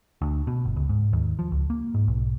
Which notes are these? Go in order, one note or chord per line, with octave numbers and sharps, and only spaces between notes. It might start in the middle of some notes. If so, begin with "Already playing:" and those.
D2
B2
G1
C#2
G#2
D#2
F3
C#2
A#3
G#2
B1